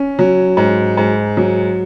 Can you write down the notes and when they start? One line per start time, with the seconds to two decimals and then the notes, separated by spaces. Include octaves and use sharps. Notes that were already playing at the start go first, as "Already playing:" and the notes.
Already playing: C#4
0.19 F#3
0.57 G#2
0.97 G#2
1.37 F#3